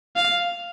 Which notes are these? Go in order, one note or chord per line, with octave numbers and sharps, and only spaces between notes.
F5